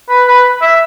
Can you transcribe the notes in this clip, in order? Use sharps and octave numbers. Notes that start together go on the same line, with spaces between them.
B4
B4
E5